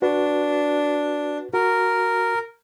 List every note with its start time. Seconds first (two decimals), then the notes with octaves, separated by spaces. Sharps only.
0.02 D4 F#4 B4
1.54 F#4 A#4